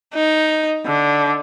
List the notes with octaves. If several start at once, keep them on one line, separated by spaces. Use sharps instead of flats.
D#4
D3